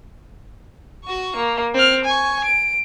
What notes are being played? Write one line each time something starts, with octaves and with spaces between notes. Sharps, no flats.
F#4 C#6
A#3
C4 F6
G#5 C#6
D7